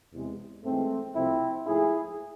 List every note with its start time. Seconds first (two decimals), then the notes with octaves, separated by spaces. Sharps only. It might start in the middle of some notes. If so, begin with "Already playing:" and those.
0.13 E2 C3 G#3
0.64 G#2 E3 G#3 A3 C4
1.15 C2 C3 F3 A3 C4 E4
1.67 G#2 F3 A3 E4 G#4